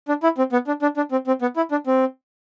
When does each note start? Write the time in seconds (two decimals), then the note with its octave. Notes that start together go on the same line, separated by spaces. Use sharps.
0.08 D4
0.23 E4
0.38 C4
0.52 B3
0.67 D4
0.82 D4
0.97 D4
1.12 C4
1.27 C4
1.42 B3
1.57 E4
1.71 D4
1.87 C4